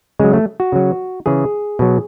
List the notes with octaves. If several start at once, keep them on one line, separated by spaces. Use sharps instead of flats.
C#3 F#3 G#3
A3
F#4
C#3 F#3
C#3 E3 G#4
B2 F#3